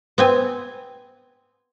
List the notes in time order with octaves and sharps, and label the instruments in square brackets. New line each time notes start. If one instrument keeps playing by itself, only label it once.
[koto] B3 C4 G#5